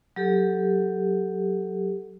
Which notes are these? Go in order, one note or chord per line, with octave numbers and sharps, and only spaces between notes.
F#3 G4 A4